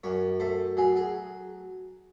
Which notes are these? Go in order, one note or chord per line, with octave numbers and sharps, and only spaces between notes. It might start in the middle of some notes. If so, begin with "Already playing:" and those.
F#2 C#5
A3 C5
F#3 G#4
G#4